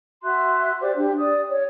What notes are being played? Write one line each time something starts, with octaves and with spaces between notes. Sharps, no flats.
F#4 E5 C6 F#6
G4 C5 D5 D6
D4 G4
D5 D#6
C#5